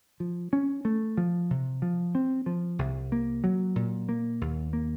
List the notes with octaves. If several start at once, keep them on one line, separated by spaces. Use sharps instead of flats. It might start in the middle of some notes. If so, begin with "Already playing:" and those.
F3
C#4
A3
F3
C3
F3
C4
F3
C2
A#3
F#3
A#2
A#3
D#2
A#3